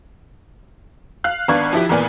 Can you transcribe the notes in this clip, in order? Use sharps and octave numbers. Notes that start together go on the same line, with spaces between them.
F5 F#6
G#1 B3 D4 F5 C#6 G#6
F3 E4 G4
G#1 E2 A#2 B3 D5 G#5